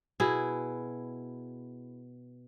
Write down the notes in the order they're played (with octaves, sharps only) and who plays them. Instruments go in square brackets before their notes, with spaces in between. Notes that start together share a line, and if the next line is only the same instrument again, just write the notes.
[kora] B2 E4 G#4